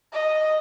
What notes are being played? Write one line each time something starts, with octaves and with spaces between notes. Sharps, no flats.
D#5